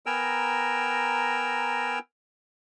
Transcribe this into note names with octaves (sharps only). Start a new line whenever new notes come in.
B3 A#4 G5 G#5 A#5 E6